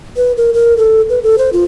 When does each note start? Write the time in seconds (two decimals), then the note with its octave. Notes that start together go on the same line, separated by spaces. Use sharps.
0.17 B4
0.37 A#4
0.54 A#4
0.77 A4
1.09 B4
1.23 A4
1.38 C5
1.53 F4